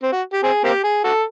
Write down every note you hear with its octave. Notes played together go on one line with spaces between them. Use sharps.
C4
F#4
G4
C4 G#4
A#3 C4 G4
G#4
F#4 A4